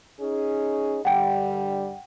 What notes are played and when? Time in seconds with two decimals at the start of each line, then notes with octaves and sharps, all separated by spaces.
0.20 C#4 D#4 G#4
1.05 G2 D3 G3 F#5 G5